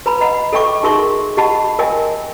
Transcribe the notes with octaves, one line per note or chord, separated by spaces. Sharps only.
B4 A#5 B5
D#5 F#5 B5
A4 D#5 E5 G5 C#6 D6
D#4 G#4 A#4 E5 C6 C#6
G4 D#5 F#5 A5 B5
A#4 D#5 E5 G5 G#5